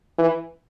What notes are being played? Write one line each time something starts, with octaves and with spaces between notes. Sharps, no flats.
E3